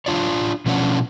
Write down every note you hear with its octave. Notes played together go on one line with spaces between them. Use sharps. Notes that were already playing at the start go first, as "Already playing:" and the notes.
D4 F4 C#5 D5
B2 F3 C#4 D4 F#5